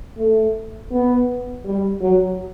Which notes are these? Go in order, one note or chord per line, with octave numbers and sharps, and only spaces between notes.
A3
B3
G3
F#3